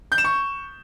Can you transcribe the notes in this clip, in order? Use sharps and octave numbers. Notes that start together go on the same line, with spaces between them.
G6
E7
C#6